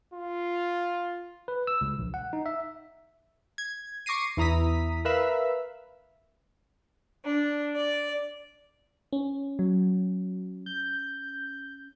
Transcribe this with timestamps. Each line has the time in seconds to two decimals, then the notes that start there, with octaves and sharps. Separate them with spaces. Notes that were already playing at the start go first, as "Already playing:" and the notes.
0.13 F4
1.48 B4
1.67 E6
1.81 C#2
1.99 A#1
2.14 F#5
2.33 D#4
2.46 E5
3.58 G#6
4.06 C#6 D6 A#6 C7 D#7
4.37 E2 E4 A#5 D#6 B6
5.05 A#4 B4 E5 F5
7.23 D4
7.74 D5
9.13 C#4
9.59 F#3
10.66 G6